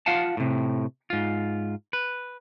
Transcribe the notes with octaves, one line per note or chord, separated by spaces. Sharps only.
F4 F5 F#5 A5
A2 C3
G#2 F4
B4